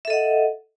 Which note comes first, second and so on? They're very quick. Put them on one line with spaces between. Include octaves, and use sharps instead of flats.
E5 A4 D#5 F#5